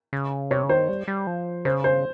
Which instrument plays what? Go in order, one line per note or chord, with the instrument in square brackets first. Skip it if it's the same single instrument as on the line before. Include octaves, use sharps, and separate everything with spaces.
[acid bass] C#3
[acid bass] C3 [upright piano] C#5
[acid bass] C#3
[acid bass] D#3 [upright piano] C5
[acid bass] G3
G3
F3
[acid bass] C#3 [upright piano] C5
[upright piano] C5